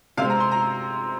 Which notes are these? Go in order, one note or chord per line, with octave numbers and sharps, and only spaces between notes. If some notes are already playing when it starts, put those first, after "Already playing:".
C3 G#3 C4 F5
A#5
C6
A#5